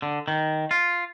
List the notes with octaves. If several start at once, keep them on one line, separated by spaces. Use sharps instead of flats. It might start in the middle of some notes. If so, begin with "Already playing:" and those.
D3
D#3
F4